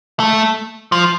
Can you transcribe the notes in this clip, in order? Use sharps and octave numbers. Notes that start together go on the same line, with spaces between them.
A3
F3